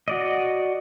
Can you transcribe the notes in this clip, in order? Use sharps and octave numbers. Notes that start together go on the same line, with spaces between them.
F#4 D5 D#5